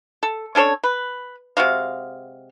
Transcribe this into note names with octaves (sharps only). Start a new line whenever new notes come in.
A4
C#4 D4 A4 C#5
B4
C3 G#3 F#4 F5